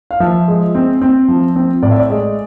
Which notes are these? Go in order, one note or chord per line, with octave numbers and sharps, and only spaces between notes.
F5
F3 E5
G#3
C4
C4
F3
C4
A2 D5
E5
D5
G#3